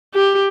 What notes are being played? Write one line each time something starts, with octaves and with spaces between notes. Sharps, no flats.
G4